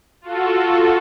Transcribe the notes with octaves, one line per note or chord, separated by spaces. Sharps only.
F4 F#4 A4